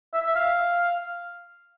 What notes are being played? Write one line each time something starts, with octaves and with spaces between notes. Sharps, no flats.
E5
E5
F5